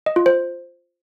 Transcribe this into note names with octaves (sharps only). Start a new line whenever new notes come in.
D#5
F4
C5